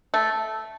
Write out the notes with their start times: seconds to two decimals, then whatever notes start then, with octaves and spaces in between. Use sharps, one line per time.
0.14 A3